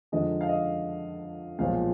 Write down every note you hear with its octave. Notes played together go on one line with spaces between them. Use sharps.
F2 D3 G#3 D#4 D#5
F5
D#5
B1 A#2 F3 G#3 F5